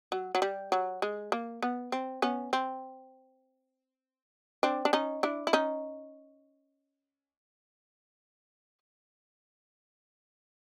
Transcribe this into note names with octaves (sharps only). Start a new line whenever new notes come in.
F#3
F#3
G3
F#3
G#3
A#3
B3
C4
B3 C#4
C4
C4 D4
D4
C#4 D#4
D4 E4
E4
C#4 D#4